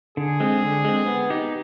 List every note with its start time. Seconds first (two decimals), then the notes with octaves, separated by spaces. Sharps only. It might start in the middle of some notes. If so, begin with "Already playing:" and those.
0.17 D3 G#4
0.40 G#3 C4
0.62 D3
0.85 G#3 C4
1.07 B3
1.30 D#4 G4